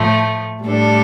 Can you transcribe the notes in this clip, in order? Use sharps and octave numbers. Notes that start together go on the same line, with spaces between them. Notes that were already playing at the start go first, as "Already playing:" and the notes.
Already playing: A2 F3 A3
A2 G3 D4 A4